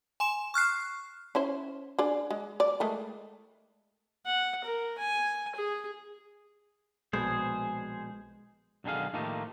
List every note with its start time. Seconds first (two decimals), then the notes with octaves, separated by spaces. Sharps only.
0.20 G#5 C6 E7
0.54 C#6 F6 F#6 C7
1.35 C#4 E4 C5
1.99 D4 G#4 D5
2.30 G#3
2.60 D5
2.80 G#3 A3 A#4
4.26 F#5
4.64 A#4
4.99 G#5
5.55 G#4
7.13 A#1 B2 G#3 G#4 C5
8.84 B1 D3 D#3 G#4 F5
9.13 A2 D#3 F3 A3 A#3 G4